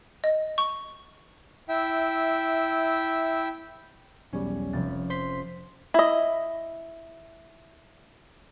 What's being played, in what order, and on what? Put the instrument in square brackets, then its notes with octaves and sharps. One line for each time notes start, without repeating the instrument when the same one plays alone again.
[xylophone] D#5
C#6
[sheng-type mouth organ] E4 E5 G5
[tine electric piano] B1 E2 G3 [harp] C#4
[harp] F1 A6
[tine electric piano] C5 C6 B6
[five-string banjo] E4 D#5